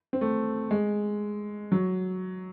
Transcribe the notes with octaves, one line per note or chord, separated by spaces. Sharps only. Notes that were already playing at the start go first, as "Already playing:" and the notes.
C4
A3
G#3
F#3